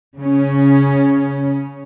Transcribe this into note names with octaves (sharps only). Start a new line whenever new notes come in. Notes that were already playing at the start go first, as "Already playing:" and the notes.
C#3 C#4